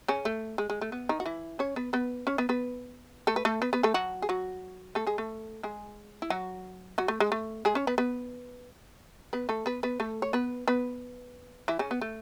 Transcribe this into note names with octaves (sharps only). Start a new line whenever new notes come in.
C#3 C#4
A3
G#3
G#3
A3
B3
D#3 D#4
F#4
E3 E4
C#4 C#5
B3 B4
B3 B4
C#4 C#5
B3 B4
B3 B4
A3 A4
B4
A3 A4
B3 B4
B3 B4
A3 A4
F#3 F#4
G#4
F#3 F#4
A3 A4
G#3 G#4
A3 A4
G#3 G#4
E4
F#3 F#4
F#3 F#4
A3
G#3
A3
G#3 G#4
C#4 C#5
B3 B4
B3 B4
B3 B4
A3 A4
B3 B4
B3 B4
A3 A4
C#5
B3 B4
B3 B4
E3 E4
C#3 C#4
B3
A3